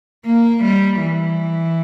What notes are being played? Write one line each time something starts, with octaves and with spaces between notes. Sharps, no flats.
A#3
G3
E3